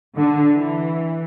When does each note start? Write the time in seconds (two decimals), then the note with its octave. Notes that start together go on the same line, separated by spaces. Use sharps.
0.17 D3
0.53 E3